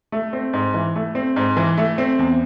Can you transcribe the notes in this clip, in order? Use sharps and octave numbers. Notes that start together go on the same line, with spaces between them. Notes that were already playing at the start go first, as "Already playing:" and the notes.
A3
C4
G#2
E3
A3
C4
G#2
E3
A3
C4
E2